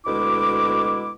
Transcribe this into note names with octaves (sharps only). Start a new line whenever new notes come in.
D2 B2 G#3 E4 D6